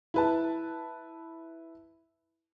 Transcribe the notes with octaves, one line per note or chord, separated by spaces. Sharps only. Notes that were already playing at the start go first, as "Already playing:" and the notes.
E4 B4 A5